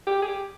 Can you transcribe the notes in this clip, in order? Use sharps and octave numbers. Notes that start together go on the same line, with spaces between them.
G4
G#4
G4